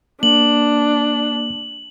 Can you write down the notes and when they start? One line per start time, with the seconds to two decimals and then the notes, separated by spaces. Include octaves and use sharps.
0.23 A#3 D4 F#7